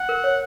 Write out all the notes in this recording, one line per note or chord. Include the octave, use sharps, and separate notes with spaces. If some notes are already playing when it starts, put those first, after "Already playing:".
Already playing: F#5
A#4
C#5